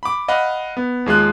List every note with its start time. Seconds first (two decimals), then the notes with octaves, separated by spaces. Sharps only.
0.03 B5 D6
0.28 D#5 F5 F#5 B5
0.77 B3
1.06 D#2 G#3 F4 F#6